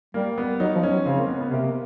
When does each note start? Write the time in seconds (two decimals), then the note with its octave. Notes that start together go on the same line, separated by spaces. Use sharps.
0.14 G3 A#3
0.38 B3
0.60 F#3 D#4
0.75 F3
0.83 C#4
0.91 F#3
1.05 C#3 C4
1.18 A#3
1.28 B3
1.41 B3
1.50 C3 A#3